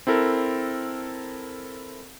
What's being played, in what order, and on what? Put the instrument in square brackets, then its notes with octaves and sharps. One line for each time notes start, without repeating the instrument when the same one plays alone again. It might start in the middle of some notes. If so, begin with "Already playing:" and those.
[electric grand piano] C4 E4 A4 A#4